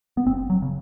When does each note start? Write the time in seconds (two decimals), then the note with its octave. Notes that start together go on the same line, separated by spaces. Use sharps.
0.17 B3
0.26 F#1 C4
0.50 F#3
0.62 C#3